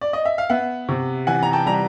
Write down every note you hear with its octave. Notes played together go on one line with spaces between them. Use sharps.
D5
D#5
E5
F5
B3 E5 F#5
C3
E3 F#5 G#5
A#5
G5 A5
G3 A#5